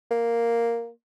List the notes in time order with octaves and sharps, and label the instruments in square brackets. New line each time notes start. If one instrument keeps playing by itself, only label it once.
[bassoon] A#3